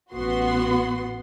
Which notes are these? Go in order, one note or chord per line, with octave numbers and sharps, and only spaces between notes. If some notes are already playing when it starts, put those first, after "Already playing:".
A1 B3 F#4 C6